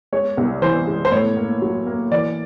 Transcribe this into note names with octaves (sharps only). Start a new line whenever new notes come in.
G#3 C#5
C2
E3 C5
G#3
C5
A2 C#5
A#3
F#3
A#3
E3 D5